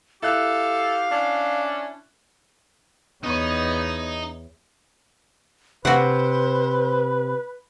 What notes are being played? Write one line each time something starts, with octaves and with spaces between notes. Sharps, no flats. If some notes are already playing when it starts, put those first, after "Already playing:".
E4 G4 A4 F5 F#6
C#4 D4
E2 B3 D#4 C#5
C3 F#4 B4 C5 F#5